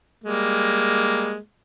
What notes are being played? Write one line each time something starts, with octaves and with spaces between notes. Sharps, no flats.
G3 G#3 A#3